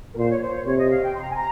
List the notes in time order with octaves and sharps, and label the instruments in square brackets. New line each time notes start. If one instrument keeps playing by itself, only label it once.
[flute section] A#4
[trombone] A#2 [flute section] C5
[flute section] C#5
C5
C#5
[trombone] C3 [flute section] C#5
[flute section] D#5
F5
G5
C6
A#5
G#5
A#5